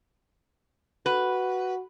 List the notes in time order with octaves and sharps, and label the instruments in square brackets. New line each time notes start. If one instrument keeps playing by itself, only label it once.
[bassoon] F#4 [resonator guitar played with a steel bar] B4